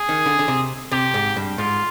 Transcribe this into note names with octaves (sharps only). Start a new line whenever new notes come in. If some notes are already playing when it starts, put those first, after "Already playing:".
Already playing: G#4
D#3
D3
D3
C3
C3 G4
G#2
G2
G#2 F4